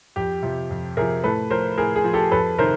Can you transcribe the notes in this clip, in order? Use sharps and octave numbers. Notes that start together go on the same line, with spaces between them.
F2 G4
C3 F3
F2
C3 F3 G#4 A#4
A2 A4 B4
F3 A#4 C5
A2 G#4 A#4
G#4
F3
G4 A4
F2 A4 B4
C3 D#3 A#4 C5